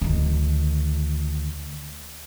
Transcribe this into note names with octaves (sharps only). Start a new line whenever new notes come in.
D2 D#3